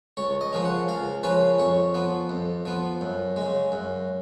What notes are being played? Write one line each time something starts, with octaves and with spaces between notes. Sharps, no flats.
C#2 C#5
D#5
C#3 F3 A#3 C#4
F#5
C#2 F5
C#3 F3 A#3 C#4 B4
F2 C#5
F3 B3
F2
F3 B3
F#2
C#3 G#3
F#2